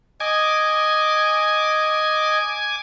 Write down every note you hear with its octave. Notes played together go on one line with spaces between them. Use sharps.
D#5 G#5 D6 G#6